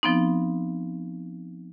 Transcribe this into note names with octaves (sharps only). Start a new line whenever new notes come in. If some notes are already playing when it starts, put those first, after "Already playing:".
F3 B3 C4 D#4